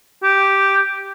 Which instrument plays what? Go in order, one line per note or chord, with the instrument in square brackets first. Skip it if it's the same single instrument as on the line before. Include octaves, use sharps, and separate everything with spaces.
[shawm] G4